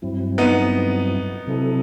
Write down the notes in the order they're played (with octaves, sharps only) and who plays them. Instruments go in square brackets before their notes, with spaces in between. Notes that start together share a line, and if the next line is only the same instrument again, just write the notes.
[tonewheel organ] G2 F#3 C4 E4
[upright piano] B3 D#4
[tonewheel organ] C3 F#3 C4 E4 A4